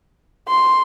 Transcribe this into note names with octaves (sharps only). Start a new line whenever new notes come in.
C6